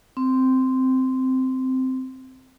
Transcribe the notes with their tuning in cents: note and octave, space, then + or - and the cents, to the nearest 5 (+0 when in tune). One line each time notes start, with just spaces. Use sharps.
C4 -10